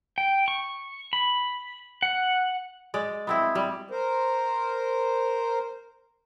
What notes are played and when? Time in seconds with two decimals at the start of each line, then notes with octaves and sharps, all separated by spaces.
0.18 G5
0.48 C#6
1.13 B5
2.02 F#5
2.94 G#3 D5
3.27 B3 C4 E4
3.55 G3
3.91 A#4 C5